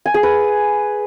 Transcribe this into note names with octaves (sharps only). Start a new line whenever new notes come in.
G#5
G#4
B4